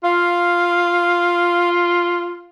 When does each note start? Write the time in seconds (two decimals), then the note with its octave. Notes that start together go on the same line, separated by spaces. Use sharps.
0.04 F4 F5